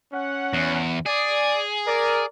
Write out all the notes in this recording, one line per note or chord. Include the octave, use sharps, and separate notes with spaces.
C#4 F#5
E2
G#4 D5
A#4 D5